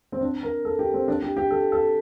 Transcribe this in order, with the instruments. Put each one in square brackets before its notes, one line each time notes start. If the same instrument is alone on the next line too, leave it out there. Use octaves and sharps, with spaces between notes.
[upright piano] C4
D4
A#4
A4
G4
C4
D4
G4
G4
A4
A4